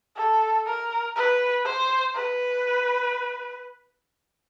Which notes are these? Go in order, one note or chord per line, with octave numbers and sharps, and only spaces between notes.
A4
A#4
B4
C5
B4